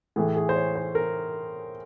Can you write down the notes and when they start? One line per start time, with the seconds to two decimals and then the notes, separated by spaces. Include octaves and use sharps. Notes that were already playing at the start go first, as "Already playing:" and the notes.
0.16 A2 E3 A3 G#4
0.36 G#4
0.49 C5
0.56 C#5
0.76 C5
0.95 A#4